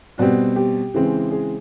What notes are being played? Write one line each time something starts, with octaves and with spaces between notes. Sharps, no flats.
B2 G3 C4 F#4
G4
C#3 E3 G#3 C4
G#4